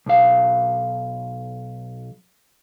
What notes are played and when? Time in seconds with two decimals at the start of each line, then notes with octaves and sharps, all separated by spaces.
0.06 B1 F5